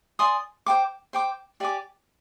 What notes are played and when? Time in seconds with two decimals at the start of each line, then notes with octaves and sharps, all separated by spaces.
0.19 D5 G#5 C6 D#6
0.66 C5 G5 D6
1.13 C5 G5 D6
1.60 G4 D5 G#5 D6